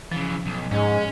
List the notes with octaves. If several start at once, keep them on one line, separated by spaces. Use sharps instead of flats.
C#3 E3 F3
B1
G#2 G#3 C#4